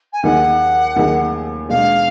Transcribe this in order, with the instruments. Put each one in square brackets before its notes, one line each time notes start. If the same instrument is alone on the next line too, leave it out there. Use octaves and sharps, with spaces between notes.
[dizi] G#5
[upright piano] D#2 D#3 A#3 D#4 G#4 [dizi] F#5
[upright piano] D#2 D#3 A#3 D#4 G#4
[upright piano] B2 G#3 D4 [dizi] F5